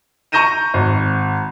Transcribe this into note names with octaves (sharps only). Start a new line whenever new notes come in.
A#5 C#6 G6 A#6 D#7 E7
G#1